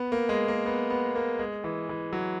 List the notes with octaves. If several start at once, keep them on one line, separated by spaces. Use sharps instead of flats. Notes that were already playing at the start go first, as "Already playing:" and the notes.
Already playing: B3
A#3
G#3
A#3
B3
B3
A#3
G#3
E3
E3
F#3